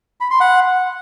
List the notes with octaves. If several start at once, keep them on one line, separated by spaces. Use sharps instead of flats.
B5
C6
F#5